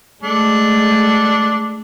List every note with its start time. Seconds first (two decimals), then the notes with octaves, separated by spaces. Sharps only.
0.23 G#3 A3 D4 A4